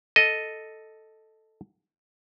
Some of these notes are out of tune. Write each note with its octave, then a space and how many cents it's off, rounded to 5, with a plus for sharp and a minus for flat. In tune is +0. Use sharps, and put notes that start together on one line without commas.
A4 +0 D#5 +0